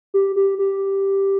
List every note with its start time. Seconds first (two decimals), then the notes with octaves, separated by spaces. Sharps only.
0.14 G4
0.36 G4
0.59 G4